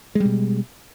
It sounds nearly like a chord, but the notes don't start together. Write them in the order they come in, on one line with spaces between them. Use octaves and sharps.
G#3 G3 B2